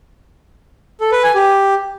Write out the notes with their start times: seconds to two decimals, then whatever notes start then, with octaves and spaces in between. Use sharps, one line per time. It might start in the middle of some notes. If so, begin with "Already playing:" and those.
1.01 A4
1.12 B4
1.23 G#5
1.35 G4